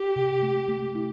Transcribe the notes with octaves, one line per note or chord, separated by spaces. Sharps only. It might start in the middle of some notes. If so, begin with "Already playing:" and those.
Already playing: G4
C3
A3
A3
E4